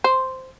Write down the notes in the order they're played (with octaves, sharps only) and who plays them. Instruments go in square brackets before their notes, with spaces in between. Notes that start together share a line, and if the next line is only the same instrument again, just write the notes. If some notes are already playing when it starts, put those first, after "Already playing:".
[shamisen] C5